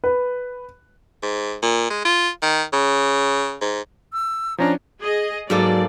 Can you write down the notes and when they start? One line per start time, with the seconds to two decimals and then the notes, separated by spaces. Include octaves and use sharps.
0.04 B4
1.23 G#2
1.62 A#2
1.90 G#3
2.05 F4
2.42 D#3
2.73 C#3
3.62 G#2
4.13 E6
4.58 F3 C#4 D4 A#5
5.01 G#4 D#5
5.50 G#2 F#3 A#3 A4 D5